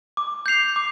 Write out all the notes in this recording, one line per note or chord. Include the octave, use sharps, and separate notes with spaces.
D6
G6 C7 F7
D6